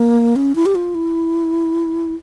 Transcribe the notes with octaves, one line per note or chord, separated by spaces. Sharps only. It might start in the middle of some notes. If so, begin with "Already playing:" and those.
Already playing: A#3
C#4
E4
G4
F4
E4